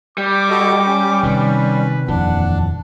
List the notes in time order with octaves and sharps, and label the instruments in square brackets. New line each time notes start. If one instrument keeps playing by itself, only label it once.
[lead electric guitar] G3 [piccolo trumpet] D6
[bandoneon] F#4 A4 D#5
C#4
[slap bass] C3 D#3 [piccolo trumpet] B4
[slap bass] D#1 F2 E3 [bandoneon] D4 [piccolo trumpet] F#5